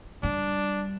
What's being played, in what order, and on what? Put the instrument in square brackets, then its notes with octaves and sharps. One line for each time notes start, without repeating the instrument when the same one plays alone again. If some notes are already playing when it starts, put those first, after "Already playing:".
[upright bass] G3 [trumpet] D4